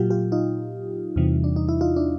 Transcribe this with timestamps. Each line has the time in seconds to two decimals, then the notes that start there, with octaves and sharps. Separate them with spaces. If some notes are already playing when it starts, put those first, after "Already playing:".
Already playing: A#2 F#3 F4 G4
0.10 F4 G4
0.32 D#4 F4
1.16 E2 C3 E3 G3
1.44 D4
1.56 D#4
1.69 E4
1.81 D#4 F4
1.96 D4 E4